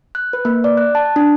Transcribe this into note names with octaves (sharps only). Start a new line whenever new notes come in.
F#6
B4
A#3
D5
F#6
A5
D4